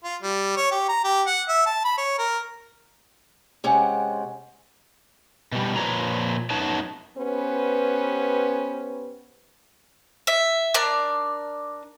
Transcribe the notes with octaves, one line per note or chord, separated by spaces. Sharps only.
F4
G3
C#5
G4
A#5
G4
F#5
E5
A5
B5
C#5
A#4
C3 G#3 C#4 G4 F#5 G5
B2 G3
A#2 F3 B4 C#5 A#5
F#2 B3 D#4 C#5 A5
B3 C#4 G4 B4 C5
E5
D4 A#4 D5